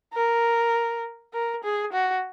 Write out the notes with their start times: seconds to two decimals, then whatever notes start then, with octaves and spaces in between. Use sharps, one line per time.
0.14 A#4
1.33 A#4
1.64 G#4
1.93 F#4